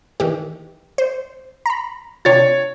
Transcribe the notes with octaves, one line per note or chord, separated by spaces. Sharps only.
D#3 E3 G4
C5
A#5 B5
C3 D4 F4 C#5 A6